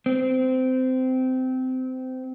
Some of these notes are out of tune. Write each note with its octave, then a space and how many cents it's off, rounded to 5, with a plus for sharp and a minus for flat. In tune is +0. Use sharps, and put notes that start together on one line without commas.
C4 -20